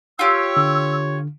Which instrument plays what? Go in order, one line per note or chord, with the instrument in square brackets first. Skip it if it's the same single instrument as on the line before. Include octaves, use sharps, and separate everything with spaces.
[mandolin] F4 G4 [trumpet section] C#5 [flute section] E6
[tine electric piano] D3